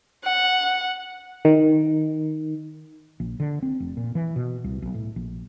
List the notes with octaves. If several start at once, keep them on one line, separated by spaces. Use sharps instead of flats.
F#5
D#3
A#1
D3
C4
F1
A#2
E3
B2
C2
B1
A2
A#1